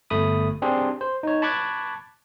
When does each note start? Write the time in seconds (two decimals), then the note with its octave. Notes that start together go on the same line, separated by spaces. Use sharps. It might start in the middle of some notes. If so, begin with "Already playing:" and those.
0.10 G1 A3 B5 D#6
0.62 C4 D4 G4 G#4 C6
1.01 C5
1.23 D#4 C#5
1.42 A5 B5 C#6 D6 F#6 G#6